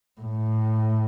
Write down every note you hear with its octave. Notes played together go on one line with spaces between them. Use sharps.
A2